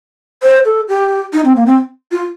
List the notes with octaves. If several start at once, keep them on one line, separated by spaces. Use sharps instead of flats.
C5
A4
G4
D#4
C4
A#3
C4
F4